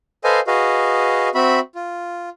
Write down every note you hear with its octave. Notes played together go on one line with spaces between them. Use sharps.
A4 B4 C5 D#5 F5 G#5
F#4 G#4 B4 D#5 F5
C4 F#4 E5 B5
F4